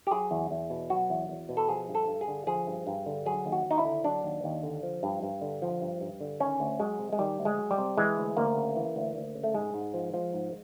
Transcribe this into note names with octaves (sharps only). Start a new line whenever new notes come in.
G4
F#3 G#4
E2
E2
B2
F#3 F#4
E2
E2
B2
A4
F3 G#4
G2
A4
G2
G#4
D3
F3 G#4
G2
G2
D3
F#3 G#4
D#2
F#4
D#2
D#4
E4
D3
F#3 D4
D#2
D#2
D3
F3
G2
G2
D3
F3
G2
G2
D3
D#3 C#4
D2
F#3 G#3
C3
G#3
D#3 G3
D2
G#3
F#3
G3
C3
E3 G#3
D2
D2 A#3
C#3
E3
D2
D2
C#3
A3
G#2 G#3
G#2
F3
F3
G#2